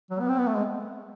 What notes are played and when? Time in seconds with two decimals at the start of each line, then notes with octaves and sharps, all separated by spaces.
0.11 F#3
0.20 B3
0.29 C4
0.38 B3
0.47 A3
0.56 G#3